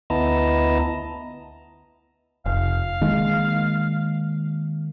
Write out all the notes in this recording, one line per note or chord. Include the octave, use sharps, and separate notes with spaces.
D2 B3 E4 D#5 A5 A#5
F1 F5
D#3 G#3 A#3